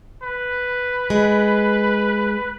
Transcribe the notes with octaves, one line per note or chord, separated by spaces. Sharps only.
B4
G#3